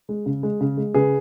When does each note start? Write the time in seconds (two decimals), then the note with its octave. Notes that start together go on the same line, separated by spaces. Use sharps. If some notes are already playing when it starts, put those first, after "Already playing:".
0.09 G#3
0.26 C#3
0.43 G#3
0.61 C#3
0.77 G#3
0.94 C#3 G#4 B4